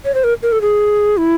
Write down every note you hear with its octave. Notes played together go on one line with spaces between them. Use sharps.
C#5
C5
A#4
A#4
A4
G#4
E4